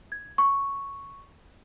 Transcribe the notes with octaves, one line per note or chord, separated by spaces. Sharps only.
G#6
C#6